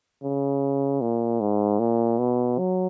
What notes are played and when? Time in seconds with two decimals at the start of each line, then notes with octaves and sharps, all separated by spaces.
0.23 C#3
1.01 A#2
1.41 G#2
1.80 A#2
2.19 B2
2.58 F#3